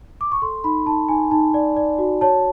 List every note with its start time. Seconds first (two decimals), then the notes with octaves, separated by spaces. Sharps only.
0.21 D6
0.32 C#6
0.42 A4 C6
0.64 D#4 B5
0.86 D#4 A5
1.08 D#4 G#5
1.31 D#4 A5
1.54 D5
1.77 D5
1.98 F#4
2.21 C#5 A5